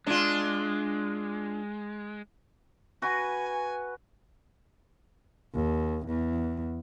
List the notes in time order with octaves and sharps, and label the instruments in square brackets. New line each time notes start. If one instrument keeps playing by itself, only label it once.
[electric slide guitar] G#3 [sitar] D4 F4
[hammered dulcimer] F#4 B4 [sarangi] G#5
[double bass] D#2
E2